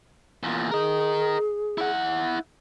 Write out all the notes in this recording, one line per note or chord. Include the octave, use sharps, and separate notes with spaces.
E2 A#2
G#4 A#4 D#5
E4 F#5